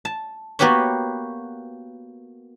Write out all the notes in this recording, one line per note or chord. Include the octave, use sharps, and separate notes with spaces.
A5
A#3 B3 F#4 G4 B4 C#5